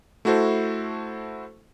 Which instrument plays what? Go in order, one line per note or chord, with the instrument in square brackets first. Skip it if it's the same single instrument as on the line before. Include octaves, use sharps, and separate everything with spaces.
[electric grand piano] A3 E4 F#4 A4 C5